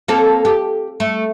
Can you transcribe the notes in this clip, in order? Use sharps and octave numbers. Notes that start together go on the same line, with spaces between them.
A#3 C4 A4
G4
A3